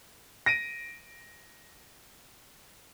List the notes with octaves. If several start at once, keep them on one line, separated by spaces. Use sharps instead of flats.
A#6 D7 D#7